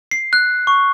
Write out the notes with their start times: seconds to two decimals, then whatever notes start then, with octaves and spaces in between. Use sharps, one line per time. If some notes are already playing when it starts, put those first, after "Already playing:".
0.11 C7
0.33 F#6
0.67 C#6